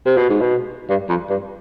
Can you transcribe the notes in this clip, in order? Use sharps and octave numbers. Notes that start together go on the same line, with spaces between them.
C3
B2
G#2
B2
G2
F2
G2